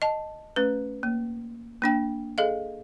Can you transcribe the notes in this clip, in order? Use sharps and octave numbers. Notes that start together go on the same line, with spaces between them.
D#5 A5
A3 C#4 B4
A#3
A#3 D4 G5
G#4 A4 D#5 F5